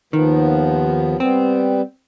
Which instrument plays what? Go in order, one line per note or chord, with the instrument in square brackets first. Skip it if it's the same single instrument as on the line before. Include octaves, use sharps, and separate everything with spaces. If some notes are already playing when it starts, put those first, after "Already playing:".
[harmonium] D#2 F3 B3 [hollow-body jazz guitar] D#3
[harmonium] G3 B3 [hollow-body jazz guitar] C4